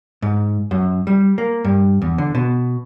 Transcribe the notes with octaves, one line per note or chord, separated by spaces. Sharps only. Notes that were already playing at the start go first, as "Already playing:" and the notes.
G#2
F#2
G3
A#3
G2
E2
D3
B2